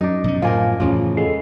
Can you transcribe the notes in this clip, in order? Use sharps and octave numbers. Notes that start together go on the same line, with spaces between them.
F#2 D4 D#4
B2 F3 C#4
A2 F3 A#3 A#4 F5 G#5
E2 A2 C#3 F3 F4
G#3 B3 A4 C7